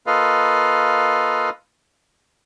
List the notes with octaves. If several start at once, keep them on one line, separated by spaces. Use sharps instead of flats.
A#3 F4 A4 B4 D#5 F5